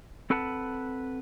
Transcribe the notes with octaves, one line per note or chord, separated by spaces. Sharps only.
C4 A4 B4 F#5 A5